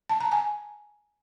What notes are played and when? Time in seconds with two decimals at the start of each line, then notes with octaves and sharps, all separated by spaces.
0.09 A5
0.21 A#5
0.32 G#5